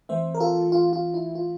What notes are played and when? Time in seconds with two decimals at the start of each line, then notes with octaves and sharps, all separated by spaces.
0.09 E3 A3 C4 C5 E5
0.34 A#4
0.40 F4 A4
0.72 F4
0.93 F4
1.14 E4
1.35 F4